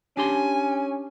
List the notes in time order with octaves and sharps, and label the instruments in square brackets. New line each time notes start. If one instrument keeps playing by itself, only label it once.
[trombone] C#4 [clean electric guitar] D4 G4 C6 [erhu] G#5